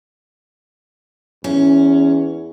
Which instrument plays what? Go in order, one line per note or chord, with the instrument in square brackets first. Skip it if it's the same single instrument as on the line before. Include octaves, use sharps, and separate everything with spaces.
[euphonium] E2 [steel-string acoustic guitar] C#4